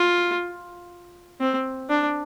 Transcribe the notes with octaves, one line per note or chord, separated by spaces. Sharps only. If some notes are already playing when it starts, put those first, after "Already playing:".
Already playing: F4
C4
D4